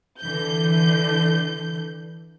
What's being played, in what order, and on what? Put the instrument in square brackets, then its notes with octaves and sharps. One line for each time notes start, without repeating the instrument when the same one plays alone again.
[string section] D3 E3 G6